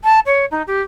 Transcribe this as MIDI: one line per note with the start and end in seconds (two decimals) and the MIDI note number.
0.04 0.19 81
0.26 0.45 73
0.51 0.62 63
0.67 0.81 67